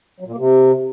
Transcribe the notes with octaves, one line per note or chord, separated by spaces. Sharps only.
F#3
A#2
A#3
C3